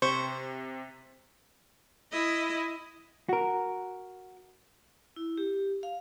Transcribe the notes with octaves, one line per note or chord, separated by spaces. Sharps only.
C3 C5 C#6
E4 D#5
F#4 A#4
E4
G4
F5